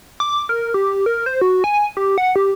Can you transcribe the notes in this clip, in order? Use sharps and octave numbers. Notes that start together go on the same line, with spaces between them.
D6
A#4
G4
A#4
C5
F#4
G#5
G4
F#5
G4